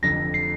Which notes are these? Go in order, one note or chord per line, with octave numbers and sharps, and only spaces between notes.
F1 F2 D3 A#6
C7